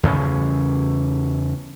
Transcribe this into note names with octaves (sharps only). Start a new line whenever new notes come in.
E2 C#3 B3 C#4